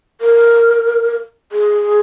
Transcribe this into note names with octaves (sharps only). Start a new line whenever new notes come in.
A#4
G#4